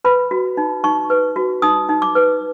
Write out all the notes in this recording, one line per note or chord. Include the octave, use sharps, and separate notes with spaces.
B4 B5
F#4
D#4
D#4 C#6
B4
F#4
D#4 D#6
D#4
D6
B4